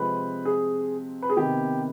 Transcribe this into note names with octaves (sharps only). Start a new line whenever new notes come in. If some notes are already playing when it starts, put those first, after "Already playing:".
Already playing: C3 F3 G#3 C4 B4
G#4
B4
G#4
C3 D#3 B3 G4